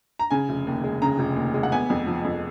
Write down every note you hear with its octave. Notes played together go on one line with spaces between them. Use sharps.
A#5
C#3 G#5
F1
D#2
G#3
C#3 A#5
F1
D#2
G#3
F#5
B3 G#5
F2
F3
F2